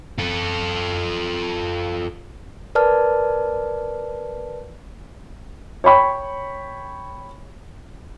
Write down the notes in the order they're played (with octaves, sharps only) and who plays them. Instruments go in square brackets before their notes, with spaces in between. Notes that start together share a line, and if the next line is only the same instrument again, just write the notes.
[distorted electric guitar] F4 A4
[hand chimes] A#4 B4 D5 A5 F6
[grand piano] C#5 G5 B5 C#6